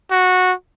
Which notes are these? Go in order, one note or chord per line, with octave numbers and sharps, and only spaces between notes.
F#4